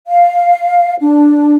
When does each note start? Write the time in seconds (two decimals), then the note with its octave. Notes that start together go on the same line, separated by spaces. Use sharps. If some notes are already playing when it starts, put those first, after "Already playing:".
0.07 F5
1.00 D4